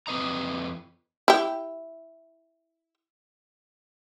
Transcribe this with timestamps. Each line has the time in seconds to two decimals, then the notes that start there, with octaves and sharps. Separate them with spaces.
0.07 F2 C4 B4 D#5 A#5
1.28 E4 G4